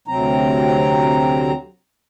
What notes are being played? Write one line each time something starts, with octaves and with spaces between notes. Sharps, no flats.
D2 C3 F#3 C4 A#5